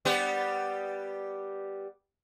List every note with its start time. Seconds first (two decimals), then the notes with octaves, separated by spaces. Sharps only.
0.05 G3 B3 G4